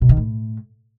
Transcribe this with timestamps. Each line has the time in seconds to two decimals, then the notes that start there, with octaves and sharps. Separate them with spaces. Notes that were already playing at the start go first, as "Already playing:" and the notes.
0.01 B2
0.09 D#3
0.17 A2